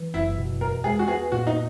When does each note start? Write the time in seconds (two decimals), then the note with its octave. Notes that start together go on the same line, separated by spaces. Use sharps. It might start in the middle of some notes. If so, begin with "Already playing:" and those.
Already playing: E3
0.14 F#1 E4
0.38 B2
0.61 E2 A#4
0.84 G#3 G#4
0.99 F#4
1.08 B3 G#4
1.32 A#2 F#4
1.47 D#4